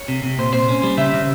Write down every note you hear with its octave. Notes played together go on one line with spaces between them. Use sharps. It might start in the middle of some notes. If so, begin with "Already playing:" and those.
Already playing: C#5
C3
C3
A#2 C5
A#2 C5
C#4
G3
C#3 E5
C#3